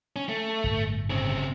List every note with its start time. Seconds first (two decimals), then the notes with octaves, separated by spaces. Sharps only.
0.16 C#4
0.29 A3
0.64 G1 A2
1.10 C#3 C4